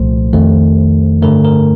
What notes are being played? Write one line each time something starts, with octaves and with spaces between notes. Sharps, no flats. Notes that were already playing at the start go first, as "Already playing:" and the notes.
Already playing: C2 A#2 F3 A3 C5
F2 D#3 A3
G2 D3 A3 A#4
A#4